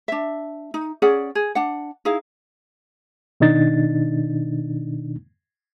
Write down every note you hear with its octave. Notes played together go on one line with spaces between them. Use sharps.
D4 E5
D#4
C#4 G#4 D5 F#5
G#4
D4 F#5
D#4 E4 G#4 F5
B2 D#3 D4 D#4 A6